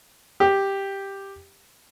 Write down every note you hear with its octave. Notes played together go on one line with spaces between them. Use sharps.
G4